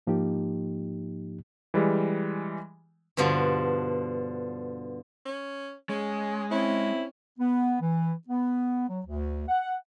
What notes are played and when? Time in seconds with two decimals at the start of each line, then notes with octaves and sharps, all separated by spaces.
0.07 G#2 F3 A#3 D#4 G4
1.74 E3 G3 G#3
3.17 G2 B2 D3 F3
5.25 C#4
5.89 G#3 C#4
6.51 C4 C#4 E4
7.39 B3
7.80 E3
8.27 B3
8.88 F#3
9.06 D2
9.48 F#5